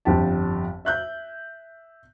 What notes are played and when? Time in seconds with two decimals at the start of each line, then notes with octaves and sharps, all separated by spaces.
0.05 G1 F2 G4 A5
0.85 E5 F#6 G6